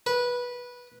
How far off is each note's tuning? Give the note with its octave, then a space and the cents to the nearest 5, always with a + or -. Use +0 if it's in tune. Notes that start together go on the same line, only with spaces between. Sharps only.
B4 -15